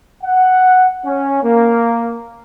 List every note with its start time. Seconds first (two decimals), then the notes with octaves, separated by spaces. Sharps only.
0.24 F#5
1.05 C#4
1.43 A#3